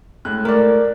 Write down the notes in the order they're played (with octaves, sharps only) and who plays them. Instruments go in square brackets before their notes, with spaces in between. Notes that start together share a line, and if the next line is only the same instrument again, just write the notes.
[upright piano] A2 G#3 F#6
[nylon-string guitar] A3 A4 [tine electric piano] A#4 D5